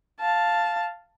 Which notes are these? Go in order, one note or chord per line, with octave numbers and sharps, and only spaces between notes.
F5 A5